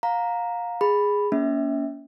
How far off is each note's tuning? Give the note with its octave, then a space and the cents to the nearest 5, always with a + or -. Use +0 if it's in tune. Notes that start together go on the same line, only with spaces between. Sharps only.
F5 +25 A#5 +0
G#4 -10 B5 +0
A#3 +15 C#4 +35 E5 -25